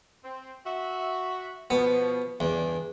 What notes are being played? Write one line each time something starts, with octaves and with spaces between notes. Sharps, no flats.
C4
F#4 E5
B2 F3 B3
E2 G2 C#3 D4